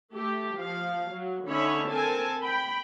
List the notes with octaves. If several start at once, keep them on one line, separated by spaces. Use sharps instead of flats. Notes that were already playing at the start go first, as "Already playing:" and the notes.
A3 G4
F3 F5
F#3
D3 C#4 D#4 C#5 E5 B5
C4 A4 A#4 G#5 A5
G5 B5